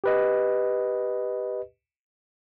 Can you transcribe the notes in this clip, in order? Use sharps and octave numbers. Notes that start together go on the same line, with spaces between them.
G4 B4 D#5